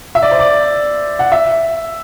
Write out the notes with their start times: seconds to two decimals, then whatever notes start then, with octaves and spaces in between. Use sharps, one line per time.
0.15 E5
0.22 D5
0.31 C5
0.39 D5
1.19 F#5
1.32 E5